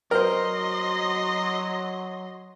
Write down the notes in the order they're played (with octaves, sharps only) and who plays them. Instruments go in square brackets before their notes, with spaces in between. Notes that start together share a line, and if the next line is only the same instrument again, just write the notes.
[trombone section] F#3 [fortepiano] A#4 C5 [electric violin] D#5 C6